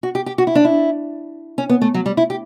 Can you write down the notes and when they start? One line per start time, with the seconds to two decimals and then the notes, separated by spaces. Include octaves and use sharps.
0.03 F#4
0.15 G4
0.26 G4
0.38 F#4
0.47 E4
0.55 D4
0.65 E4
1.58 C#4
1.69 B3
1.82 A3
1.94 F#3
2.06 G3
2.17 E4
2.30 G4